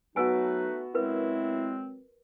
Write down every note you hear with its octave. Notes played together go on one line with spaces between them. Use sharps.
F#3 A3 B3 D#4 F#4 B4 G#5 E6
F#3 G#3 C4 E4 A#4 B4